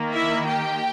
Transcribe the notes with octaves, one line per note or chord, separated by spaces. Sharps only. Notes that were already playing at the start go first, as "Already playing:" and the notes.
Already playing: D#3 A#3
E4 E5
G4 G5